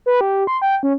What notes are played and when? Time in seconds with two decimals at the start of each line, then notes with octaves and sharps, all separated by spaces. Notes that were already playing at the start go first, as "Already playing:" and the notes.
0.06 B4
0.21 G4
0.47 C6
0.62 G5
0.83 C#4